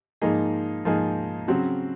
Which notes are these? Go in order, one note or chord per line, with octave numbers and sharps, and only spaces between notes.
G#2 F3 A#3 D#4 G#4
G#2 F3 A#3 D#4 G#4
C#3 F#3 C4 F#4